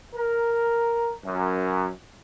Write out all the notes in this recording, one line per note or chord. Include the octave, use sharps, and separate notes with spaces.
A#4
F#2